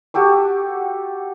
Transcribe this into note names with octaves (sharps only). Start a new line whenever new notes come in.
F#4 G4 A4 D6